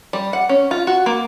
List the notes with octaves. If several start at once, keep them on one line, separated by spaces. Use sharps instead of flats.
G3
F#5
C#4
F4
F#4
A#3